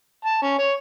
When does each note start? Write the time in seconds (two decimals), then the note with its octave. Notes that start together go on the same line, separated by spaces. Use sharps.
0.25 A5
0.42 C#4
0.58 C#5